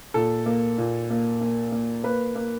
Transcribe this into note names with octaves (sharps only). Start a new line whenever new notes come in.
A#2 A4
A#3
A#2
A#3
A#3
A#3
A#3 B4
A#3